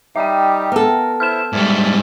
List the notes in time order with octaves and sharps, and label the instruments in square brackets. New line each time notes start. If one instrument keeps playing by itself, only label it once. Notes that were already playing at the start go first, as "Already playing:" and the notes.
[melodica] G3 D#4 G4 [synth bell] E5 G5
[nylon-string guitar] B3 A4 [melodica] A#4
[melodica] E4 C5 E5 [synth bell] F6 E7
[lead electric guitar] G#2 G3 [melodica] D5 E5 G#5